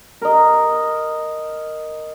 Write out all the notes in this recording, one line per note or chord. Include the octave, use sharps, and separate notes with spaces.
A#4 D#5